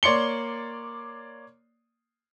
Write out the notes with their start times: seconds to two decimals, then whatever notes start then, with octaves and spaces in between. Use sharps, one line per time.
0.03 A#3 C#5 D5 C6 C#7 G7